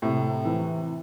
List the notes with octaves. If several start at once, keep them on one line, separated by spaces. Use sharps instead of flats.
A2 C3
E3